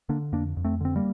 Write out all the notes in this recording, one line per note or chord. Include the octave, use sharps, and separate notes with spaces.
D3 A#3 D4
F2 A#3 D4
F2
A3 C4
D3 C4
G3 A#3